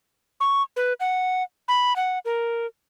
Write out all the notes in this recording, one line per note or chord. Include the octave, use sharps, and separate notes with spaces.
C#6
B4
F#5
B5
F#5
A#4